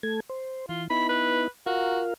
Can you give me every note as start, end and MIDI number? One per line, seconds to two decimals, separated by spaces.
0.03 0.20 57
0.03 0.20 69
0.03 0.20 92
0.30 0.66 72
0.69 0.88 52
0.69 0.83 65
0.90 1.48 59
0.90 1.48 63
0.90 1.48 64
0.90 1.06 83
1.09 1.45 71
1.66 2.14 65
1.66 2.01 66
1.66 2.14 70
1.66 2.14 77